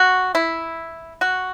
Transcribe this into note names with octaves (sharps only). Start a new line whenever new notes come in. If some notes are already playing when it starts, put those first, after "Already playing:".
Already playing: F#4
E4
F#4